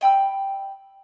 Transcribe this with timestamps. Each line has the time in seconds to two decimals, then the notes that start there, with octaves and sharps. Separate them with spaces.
0.01 D#5 G5 B5 E6